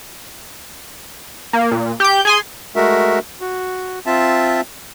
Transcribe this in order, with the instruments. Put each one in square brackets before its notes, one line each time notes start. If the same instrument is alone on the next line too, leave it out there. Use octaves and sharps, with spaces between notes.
[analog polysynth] A#3
A#2
G4 G6
G#4 G#5 C6
[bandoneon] G#3 A3 F#4 A#4 E5
F#4
C4 F4 E5 A5